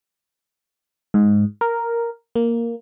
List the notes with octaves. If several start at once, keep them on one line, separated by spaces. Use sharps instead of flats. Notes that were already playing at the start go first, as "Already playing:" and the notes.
G#2
A#4
A#3